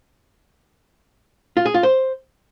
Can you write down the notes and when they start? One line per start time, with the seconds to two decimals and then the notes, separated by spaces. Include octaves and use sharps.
1.57 F4
1.65 G#4
1.74 F4
1.83 C5